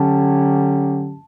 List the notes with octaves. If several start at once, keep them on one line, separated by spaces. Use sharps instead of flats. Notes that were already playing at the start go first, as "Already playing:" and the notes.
Already playing: D3 F#3 C#4 G4 A5